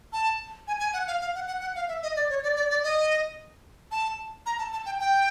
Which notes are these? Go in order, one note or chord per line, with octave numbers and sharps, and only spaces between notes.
A5
G#5
G#5
F#5
F5
F5
F#5
F#5
F#5
F5
E5
D#5
D5
C#5
D5
D5
D5
D#5
A5
A#5
A5
A5
G5
G5